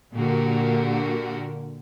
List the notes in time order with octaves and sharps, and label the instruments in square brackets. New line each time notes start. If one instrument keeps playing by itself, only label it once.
[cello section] A#2 D3 A#3 F#4 G4 A#4